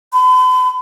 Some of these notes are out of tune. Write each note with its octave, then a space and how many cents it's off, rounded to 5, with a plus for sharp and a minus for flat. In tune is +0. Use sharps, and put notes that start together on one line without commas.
B5 +45